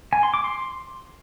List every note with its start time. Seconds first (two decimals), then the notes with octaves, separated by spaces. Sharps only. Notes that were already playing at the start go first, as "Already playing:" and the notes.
0.13 G#5
0.23 C6
0.34 D6
0.44 C6